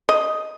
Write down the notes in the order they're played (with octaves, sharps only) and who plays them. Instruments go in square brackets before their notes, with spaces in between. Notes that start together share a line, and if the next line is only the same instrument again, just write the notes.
[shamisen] D#5